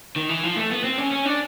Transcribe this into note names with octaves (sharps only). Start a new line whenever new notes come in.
D#3
E3
F3
A3
B3
C4
C#4
C#4
D4